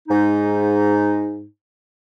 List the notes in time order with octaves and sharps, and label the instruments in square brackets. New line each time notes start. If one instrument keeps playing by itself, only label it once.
[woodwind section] G#2 D#4